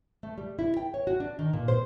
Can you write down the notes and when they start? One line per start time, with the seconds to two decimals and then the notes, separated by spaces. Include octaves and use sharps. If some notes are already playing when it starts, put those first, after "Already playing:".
0.23 A3
0.38 G3
0.59 E4
0.77 G5
0.94 C#5
1.07 F#4
1.20 D4
1.39 D#3
1.53 A#2
1.68 C5